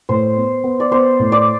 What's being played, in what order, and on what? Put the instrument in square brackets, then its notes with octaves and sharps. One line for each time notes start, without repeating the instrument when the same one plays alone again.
[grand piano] A2 [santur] C5
[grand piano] B3
B3
[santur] D5
[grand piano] B3 [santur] C5
[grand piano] A2
[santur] D5